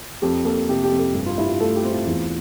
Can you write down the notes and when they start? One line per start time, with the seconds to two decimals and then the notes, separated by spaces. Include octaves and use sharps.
0.22 F2 G4
0.45 A#3 A4
0.69 C3 G4
0.84 G4
0.92 F2
0.99 A4
1.14 G2 G4
1.26 F4
1.38 G2 E4
1.49 F4
1.61 A3 A4
1.76 G4
1.84 C4
1.92 F4
2.07 E2